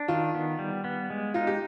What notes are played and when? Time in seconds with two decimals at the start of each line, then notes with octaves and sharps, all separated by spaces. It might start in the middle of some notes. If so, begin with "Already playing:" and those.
Already playing: D4
0.08 D#3 F4
0.34 B3
0.59 G3
0.84 B3
1.10 G#3
1.34 D#4 F4
1.47 G4